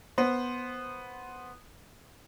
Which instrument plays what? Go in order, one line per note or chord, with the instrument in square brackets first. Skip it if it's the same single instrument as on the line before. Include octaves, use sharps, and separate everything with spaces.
[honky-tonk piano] B3 C5